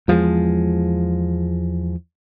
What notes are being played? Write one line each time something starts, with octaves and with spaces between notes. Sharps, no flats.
E2 F3 G3 G#3